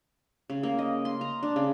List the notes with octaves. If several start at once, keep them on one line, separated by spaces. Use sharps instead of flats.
C#3
A#3
D#5
C6
A#5
D4
C#3